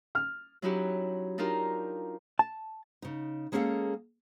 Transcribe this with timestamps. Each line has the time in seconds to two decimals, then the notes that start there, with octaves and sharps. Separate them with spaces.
0.15 F6
0.62 F#3 C#4 D#4 E4 F#4 G4
1.38 D4 D#4 F4 G4 A#4
2.39 A5
3.02 C#3 D#4
3.52 G#3 A#3 C#4 G#4 A4 F5